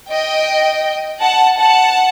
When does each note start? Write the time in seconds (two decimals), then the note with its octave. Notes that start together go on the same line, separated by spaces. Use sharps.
0.11 D#5 G5
1.21 F#5 A5
1.58 F#5 A5